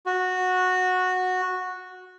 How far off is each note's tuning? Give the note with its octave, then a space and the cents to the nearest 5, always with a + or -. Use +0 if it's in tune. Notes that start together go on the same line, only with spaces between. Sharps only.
F#4 -10